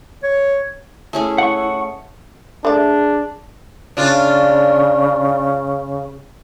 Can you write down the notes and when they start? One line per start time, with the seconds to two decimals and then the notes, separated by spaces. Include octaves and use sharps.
0.23 C#5
1.13 A3 C#4 E4 G#4
1.38 F#5 C#6
2.65 A3 D4 G#4 D5
3.97 C#3 D4 F4